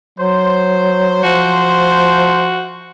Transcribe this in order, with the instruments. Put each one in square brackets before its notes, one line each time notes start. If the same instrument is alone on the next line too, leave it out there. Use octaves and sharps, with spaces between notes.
[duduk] F#3 [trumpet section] C5
[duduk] F3 [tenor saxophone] F#4